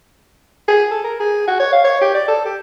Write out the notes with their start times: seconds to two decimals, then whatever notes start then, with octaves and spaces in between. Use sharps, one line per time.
0.68 G#4
0.91 A4
1.04 A#4
1.20 G#4
1.47 F#4
1.60 C#5
1.73 F5
1.84 C#5
2.01 G4
2.14 D5
2.28 A4
2.45 G4